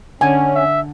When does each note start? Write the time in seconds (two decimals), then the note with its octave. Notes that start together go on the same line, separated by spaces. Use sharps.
0.21 D3 C#4 G#5
0.55 E5